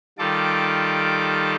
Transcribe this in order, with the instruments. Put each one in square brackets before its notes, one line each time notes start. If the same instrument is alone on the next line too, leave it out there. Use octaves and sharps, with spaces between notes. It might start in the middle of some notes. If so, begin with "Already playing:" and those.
[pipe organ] D#3 G3 F4 A4 A5 D6